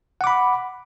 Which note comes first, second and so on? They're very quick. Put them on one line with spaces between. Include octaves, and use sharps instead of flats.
F#5 D6 B5